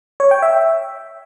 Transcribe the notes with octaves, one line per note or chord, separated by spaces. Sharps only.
C#5
G5
E5